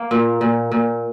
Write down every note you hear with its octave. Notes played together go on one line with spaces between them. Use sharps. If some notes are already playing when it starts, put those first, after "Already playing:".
Already playing: A#3
A#2
A#2
A#2